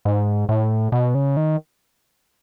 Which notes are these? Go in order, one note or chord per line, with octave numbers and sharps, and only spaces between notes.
G#2
A2
B2
C#3
D#3